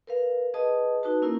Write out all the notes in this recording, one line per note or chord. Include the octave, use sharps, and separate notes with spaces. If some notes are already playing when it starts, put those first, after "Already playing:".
A#4 B4 F5
G#4 B4 D#5 A5 D#6
D#4 F#4 B4 A5
A#3 C#4 E4 A#4